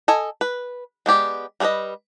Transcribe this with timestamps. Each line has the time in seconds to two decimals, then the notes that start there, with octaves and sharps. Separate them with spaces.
0.08 A4 D#5 G#5
0.41 B4
1.06 G#3 B3 G4 D5
1.60 G3 F#4 G#4 B4 D#5